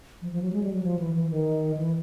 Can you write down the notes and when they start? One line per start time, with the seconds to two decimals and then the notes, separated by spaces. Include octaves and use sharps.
0.21 F3
0.32 F3
0.42 F#3
0.53 G#3
0.63 G3
0.73 F#3
0.83 F3
0.99 E3
1.14 E3
1.30 D#3
1.77 E3